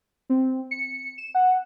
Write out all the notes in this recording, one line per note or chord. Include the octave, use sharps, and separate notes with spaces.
C4
C#7
E7
F#5